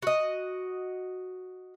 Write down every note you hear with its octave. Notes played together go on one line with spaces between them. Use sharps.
F#4 D#5